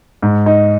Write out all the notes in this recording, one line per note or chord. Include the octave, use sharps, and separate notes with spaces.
G#2
D#4